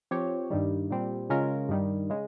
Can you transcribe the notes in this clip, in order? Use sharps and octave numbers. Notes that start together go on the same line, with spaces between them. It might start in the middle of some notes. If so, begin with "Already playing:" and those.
F3 C4 G4 C#5
G2 D#3 G3
A#2 G3 C4
C#3 G#3 C#4 F4 A#4
G2 D#3 G3
C#3 G#3